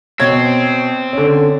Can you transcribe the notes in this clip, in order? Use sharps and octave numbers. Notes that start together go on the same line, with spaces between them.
B2 C4 C#5 G#6
D3 C#4